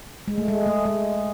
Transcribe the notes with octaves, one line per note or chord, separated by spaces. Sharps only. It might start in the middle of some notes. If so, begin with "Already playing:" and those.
G#3
A3
G#3
A3
G#3